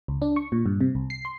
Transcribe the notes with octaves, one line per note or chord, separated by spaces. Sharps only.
C#2
D4
C#6
A#2
G2
C3
C2
C7
C6